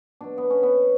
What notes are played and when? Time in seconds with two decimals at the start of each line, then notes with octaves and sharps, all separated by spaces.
0.21 B2 F#3 D4
0.38 B3
0.50 C#4
0.63 B3